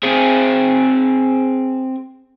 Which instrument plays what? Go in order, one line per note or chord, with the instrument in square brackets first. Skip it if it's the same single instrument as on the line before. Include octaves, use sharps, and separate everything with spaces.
[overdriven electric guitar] C4 G#4